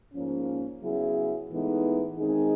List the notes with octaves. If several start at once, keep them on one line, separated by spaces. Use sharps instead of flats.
G#2 F3 A#3 C#4
C#3 F#3 B3 E4 G#4
A2 E3 G#3 B3 D#4
D#3 G#3 C4 D#4 G#4